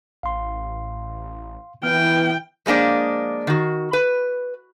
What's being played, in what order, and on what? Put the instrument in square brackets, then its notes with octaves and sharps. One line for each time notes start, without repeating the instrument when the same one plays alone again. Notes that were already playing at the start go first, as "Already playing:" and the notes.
[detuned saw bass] A1 [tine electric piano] F5 C6
[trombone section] E3 [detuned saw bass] B3 [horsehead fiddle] G5 [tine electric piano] F6
[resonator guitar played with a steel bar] F3 G#3 A#3 D4 C5
D#3 F#4
B4